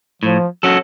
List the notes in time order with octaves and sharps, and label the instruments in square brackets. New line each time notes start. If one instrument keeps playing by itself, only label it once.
[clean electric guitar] A2 [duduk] F3
[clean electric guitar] F#3 C#4 F#4 A4